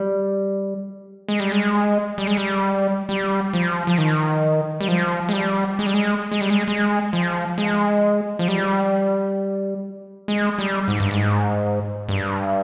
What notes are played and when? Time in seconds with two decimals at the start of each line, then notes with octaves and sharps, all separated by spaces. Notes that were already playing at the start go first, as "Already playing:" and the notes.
Already playing: G3
1.29 G#3
1.40 G3
1.52 G#3
2.18 G3
2.27 G#3
2.37 G3
3.09 G3
3.53 F3
3.87 F3
3.98 D#3
4.81 G3
4.88 F3
5.29 G#3
5.33 G3
5.79 G#3
5.86 G3
5.94 G#3
6.32 G#3
6.41 G3
6.50 G#3
6.68 G#3
7.13 F3
7.58 G#3
8.39 F3
8.48 G3
10.28 G#3
10.59 G3
10.88 G#2
11.00 G2
11.11 G#2
12.09 G2